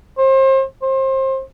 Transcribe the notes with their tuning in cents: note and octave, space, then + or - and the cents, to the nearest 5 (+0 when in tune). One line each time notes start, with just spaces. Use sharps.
C5 +35
C5 +30